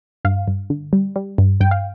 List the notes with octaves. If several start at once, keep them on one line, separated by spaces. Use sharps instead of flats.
G2 F5
G2
D3
G3
G3
G2
G2 G5
F5